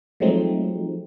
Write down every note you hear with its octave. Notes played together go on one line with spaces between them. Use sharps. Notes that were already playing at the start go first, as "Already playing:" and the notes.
F3 F#3 G#3 A3 C4 D#4